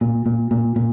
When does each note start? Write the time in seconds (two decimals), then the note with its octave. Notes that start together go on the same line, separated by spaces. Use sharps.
0.01 A#2
0.26 A#2
0.51 A#2
0.76 A#2